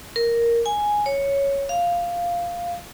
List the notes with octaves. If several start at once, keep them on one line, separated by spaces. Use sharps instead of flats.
A#4
G#5
C#5
F5